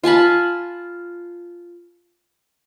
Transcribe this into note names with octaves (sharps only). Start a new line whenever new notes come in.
F4 G#5 A5 B5